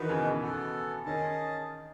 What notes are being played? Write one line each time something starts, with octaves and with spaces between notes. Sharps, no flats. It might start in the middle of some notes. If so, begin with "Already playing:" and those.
Already playing: D#3 E3 D#4 F#4 B4
C#3
B2
C#3
B3 F#4 A4
D#3 C#4 G#4 D#5 A5